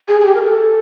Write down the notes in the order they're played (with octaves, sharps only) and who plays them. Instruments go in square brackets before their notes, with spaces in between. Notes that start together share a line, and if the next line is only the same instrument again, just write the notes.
[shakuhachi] G#4
G#4
G4
A#4
A4